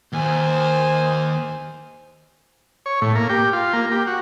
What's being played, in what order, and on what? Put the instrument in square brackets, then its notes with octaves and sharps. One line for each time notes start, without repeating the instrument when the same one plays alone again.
[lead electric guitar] D#2 [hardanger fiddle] C5 G#5
[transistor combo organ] C#5
A2
A#3
G4
F4
A#3
G4
F#4